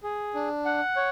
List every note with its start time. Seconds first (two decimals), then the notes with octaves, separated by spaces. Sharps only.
0.03 G#4
0.35 D4
0.65 F#5
0.96 C#5